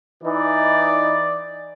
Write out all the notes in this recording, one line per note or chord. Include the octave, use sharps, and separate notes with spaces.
E3 D#4 D5